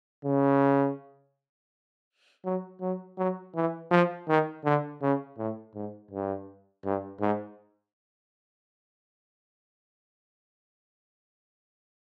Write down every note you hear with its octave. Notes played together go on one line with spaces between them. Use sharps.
C#3
F#3
F#3
F#3
E3
F3
D#3
D3
C#3
A2
G#2
G2
G2
G#2